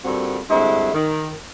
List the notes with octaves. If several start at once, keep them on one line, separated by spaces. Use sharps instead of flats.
G2 A#2 D3 C4 F#4
G2 D3 G#3 C4 E4
D#3